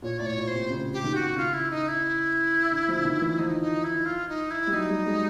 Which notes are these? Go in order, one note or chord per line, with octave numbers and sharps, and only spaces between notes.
A#2 C#5
A2 D5
C#5
A#2
C5
C3
C#3
G4
D#3
F#4
C#3 F4
E4
D#4
E4
D3
F3
D3
D#3
E3
F3 D#4
D#4
E4
F4
D#4
E4
G3
F#3 D#4
G3
G#3